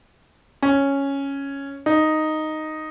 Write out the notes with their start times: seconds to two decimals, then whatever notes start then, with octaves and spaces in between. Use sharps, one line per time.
0.62 C#4
1.86 D#4